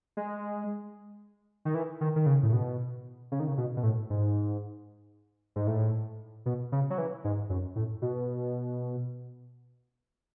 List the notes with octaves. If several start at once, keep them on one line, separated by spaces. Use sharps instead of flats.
G#3
D#3
E3
D#3
D#3
C#3
A2
B2
C#3
D#3
C#3
B2
B2
A2
G#2
G#2
A2
B2
C#3
F#3
E3
G#2
F#2
A2
B2